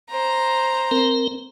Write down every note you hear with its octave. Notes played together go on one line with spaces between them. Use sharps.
C5 A#5
C4 A#4